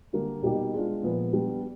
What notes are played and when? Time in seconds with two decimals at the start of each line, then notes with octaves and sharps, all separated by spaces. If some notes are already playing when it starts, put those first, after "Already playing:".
0.13 D3 G3 A#3
0.42 B2 G3 A#3 D#4 G4
0.74 G#3 B3 D4 F4
1.03 A#2 F3 G#3 B3
1.33 G3 B3 D4